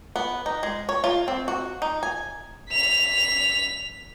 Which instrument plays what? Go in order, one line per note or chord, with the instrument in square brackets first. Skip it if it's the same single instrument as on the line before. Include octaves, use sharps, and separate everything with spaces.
[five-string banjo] B3
D#4
G#3
C#5
F4
C4
F#4
D#4
G#5
[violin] B6 F7